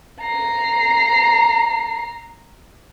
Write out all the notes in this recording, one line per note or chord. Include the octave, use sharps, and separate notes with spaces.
A#5 C7